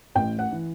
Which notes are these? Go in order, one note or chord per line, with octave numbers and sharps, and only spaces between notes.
A1 G5
F#5
E3